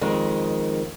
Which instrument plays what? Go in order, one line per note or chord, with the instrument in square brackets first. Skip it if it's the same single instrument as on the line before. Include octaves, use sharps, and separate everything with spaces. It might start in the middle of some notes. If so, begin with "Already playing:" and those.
[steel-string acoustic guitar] F2 D#3 G#3